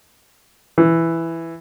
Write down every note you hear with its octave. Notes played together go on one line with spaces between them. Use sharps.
E3